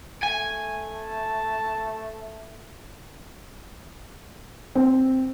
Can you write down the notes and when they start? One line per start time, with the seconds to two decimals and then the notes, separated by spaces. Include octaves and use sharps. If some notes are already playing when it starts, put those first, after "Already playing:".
0.23 A3 G#5
0.93 A5
4.75 C4